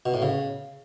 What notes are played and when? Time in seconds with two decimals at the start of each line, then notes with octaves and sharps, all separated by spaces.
0.06 B2
0.14 A2
0.22 C#3